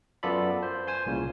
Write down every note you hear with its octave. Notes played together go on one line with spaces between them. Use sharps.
F#2 B3 F4 A4 D5 B5
C5
C5 G#5 C6
C2 A#2 C#3